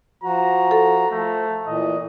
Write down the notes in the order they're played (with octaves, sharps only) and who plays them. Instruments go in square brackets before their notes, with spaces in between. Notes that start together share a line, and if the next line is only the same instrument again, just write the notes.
[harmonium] F3 F#4 [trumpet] A#5
[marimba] A4
[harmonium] F3 [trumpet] A3
[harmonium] A#2 E3 [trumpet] D#5